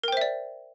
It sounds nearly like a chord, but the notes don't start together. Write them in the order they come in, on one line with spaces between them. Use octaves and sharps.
A#4 G5 C5 E5 D5